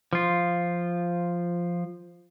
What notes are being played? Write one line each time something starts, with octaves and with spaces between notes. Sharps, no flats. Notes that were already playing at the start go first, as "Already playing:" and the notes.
F3 F4